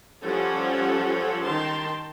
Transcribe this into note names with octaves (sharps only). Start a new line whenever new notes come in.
F3 G3 C#4 A4 C#5 F#5
D#3 G5 A5 C6